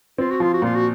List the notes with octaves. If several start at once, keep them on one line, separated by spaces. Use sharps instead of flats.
C4 F4
F#4
F3 F4
F#4
A#2 F4
F#4